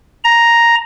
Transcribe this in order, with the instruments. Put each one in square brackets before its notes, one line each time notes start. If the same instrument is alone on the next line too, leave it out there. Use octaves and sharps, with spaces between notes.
[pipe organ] A#5